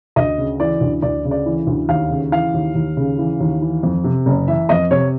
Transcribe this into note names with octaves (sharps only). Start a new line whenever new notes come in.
D2 D#5
C#3
E3 D5
D2
D2 D5
C#3
D5
E3
D2
D#2 F5
C#3
E3 F5
D#2
D#2
C#3
E3
D#2
E3
F2
C3
F#1
E3 E5
F2 D#5
C3 C#5